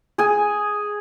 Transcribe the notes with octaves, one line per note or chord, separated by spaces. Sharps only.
G#4 G#5